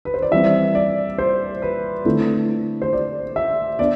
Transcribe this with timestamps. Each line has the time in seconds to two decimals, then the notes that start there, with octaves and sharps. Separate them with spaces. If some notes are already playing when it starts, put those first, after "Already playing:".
0.05 B4
0.14 C5
0.22 D5
0.31 E3 G3 C4 E5
0.75 D5
1.18 C5
1.62 B4
2.05 D3 A3 C4 E4
2.82 C5
2.93 D5
3.36 E5
3.79 B3 D4 D5